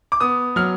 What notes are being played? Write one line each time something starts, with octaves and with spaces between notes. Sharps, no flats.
D6
B3 D#6
F#3 F6